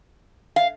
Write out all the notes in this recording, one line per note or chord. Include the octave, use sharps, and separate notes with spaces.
F5